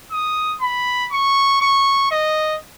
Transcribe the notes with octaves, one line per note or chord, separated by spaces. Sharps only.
D#6
B5
C#6
C#6
D#5